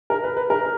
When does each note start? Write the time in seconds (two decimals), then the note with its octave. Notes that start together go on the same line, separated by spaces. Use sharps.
0.10 A#4
0.24 B4
0.37 B4
0.50 A#4